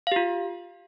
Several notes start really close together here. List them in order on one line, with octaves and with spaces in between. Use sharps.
F5 G4 F4